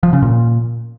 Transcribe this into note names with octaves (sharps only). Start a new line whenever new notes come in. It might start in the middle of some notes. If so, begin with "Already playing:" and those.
F3
C#3
A#2